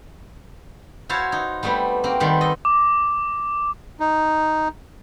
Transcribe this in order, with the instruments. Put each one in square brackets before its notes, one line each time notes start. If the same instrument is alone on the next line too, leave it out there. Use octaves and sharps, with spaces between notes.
[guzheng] E4 F#4 C5 C#5 F5 A5
D#4
G3 A3 B3 C4 G4
A#3 C4 F#4
D#3 G3 A3 B3 C4 C5
A4 D#5
[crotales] D6
[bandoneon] D#4